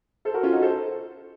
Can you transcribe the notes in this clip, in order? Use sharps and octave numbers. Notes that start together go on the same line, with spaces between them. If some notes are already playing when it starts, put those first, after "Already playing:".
A4 C5
F#4 A#4
C#4 F4
D#4 F#4
A4 C5